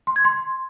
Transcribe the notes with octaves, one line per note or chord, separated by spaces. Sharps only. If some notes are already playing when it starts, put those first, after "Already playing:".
C6
G#6
C6